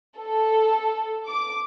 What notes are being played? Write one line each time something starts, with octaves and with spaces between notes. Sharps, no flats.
A4
D6